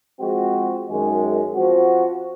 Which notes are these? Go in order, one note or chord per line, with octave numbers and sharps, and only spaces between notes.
F3 G#3 C4 F#4
F#2 D#3 G#3
F3 C4 F#4